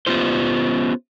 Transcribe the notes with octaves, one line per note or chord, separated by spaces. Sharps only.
B3 C#4 F4 G4 C5